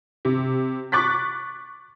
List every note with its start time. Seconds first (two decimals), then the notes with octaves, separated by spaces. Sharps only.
0.25 C3
0.92 C#6 D6 F#6 A6 B6